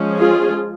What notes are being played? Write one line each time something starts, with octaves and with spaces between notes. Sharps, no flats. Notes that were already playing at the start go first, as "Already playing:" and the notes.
Already playing: F3 G#3 C#4
F4 G#4